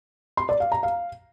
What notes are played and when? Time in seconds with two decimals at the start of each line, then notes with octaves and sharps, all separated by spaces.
0.37 C6
0.49 D5
0.60 F5
0.72 A#5
0.83 F5